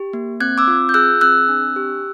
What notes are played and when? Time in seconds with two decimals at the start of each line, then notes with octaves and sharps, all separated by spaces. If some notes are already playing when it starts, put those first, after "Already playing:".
Already playing: G4
0.13 A#3
0.40 C4 F#6 G#6
0.58 D6 E6
0.68 F4
0.89 G6
0.94 G#4 E6 F#6
1.21 C4 E6 F#6
1.49 D4
1.76 G4